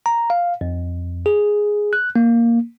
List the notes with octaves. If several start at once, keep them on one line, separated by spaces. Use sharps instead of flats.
A#5
F5
F2
G#4
F#6
A#3